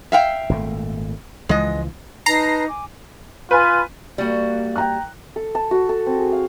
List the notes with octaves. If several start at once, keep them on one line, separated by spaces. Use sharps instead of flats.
E5 F5 G5
G#1 A#2 A3
C#2 E3 F3 G#3 D#5
D#4 B4 A5 A#5 A#6 C7
G#5 D6
F4 B4 G#5
G3 A#3 F#4
G5 A#5 F#6
A4
A5
F#4
A4
C4
G#4
F5